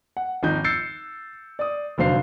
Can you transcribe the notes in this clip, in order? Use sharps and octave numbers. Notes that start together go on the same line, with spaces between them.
F#5
G#1 F3 D#4 G6
E6 G6 A6 C7 C#7
D5 D#6
F1 D3 F#3 C5 F5 C7